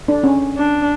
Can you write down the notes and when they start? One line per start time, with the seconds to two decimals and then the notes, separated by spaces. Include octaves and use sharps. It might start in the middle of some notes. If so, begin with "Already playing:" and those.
0.08 D4
0.24 C#4
0.57 D4